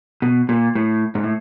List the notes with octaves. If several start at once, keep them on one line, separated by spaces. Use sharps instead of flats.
B2
A#2
A2
G#2
A2